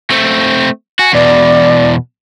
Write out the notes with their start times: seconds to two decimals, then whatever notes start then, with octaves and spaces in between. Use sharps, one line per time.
0.10 A3 C4
0.99 F#4 G#5
1.13 E2 B2 D5